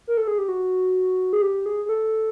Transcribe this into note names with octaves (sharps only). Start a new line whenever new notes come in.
A#4
A4
G#4
G4
F#4
G#4
G4
G#4
G#4
A4